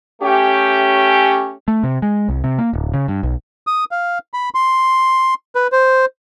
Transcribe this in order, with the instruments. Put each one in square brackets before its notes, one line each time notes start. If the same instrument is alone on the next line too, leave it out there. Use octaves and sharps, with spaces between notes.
[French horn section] A3 C#4 G4
[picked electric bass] A3
C3
G#3
C2
C3
A#3
D1
C#3
G2
B1
[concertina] D#6
F5
B5
C6
B4
C5